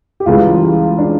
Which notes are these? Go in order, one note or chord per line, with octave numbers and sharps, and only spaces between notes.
G4
C#2 C#3 E3 G3 F4
D4